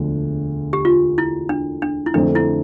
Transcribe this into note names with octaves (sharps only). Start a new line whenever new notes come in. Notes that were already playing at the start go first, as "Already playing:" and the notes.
Already playing: E1 D2 D3 F3
G4
F4
E4
D4
D4
E4
F2 D3 A3 C4 D4
E4